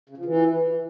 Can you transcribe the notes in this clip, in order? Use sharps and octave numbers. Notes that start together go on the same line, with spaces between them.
C#3
F3
E3